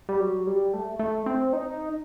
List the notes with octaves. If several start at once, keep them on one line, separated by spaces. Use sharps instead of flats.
G3
F#3
G3
A3
A3
C4
D#4